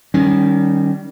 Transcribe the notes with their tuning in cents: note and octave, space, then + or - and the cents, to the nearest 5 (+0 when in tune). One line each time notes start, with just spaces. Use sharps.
D#3 -20 G3 -15 C#4 +0